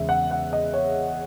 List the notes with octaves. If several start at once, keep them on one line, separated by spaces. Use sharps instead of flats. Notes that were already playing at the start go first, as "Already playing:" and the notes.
Already playing: E2 C#3 G#3 E5
F#5
F#5
D#5
C#5